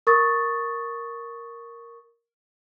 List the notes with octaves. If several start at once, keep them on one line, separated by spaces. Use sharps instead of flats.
A#4 C#6 D#6 A6